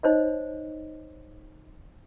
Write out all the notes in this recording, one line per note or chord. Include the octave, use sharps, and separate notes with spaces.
D#4 C5 C#5 D#5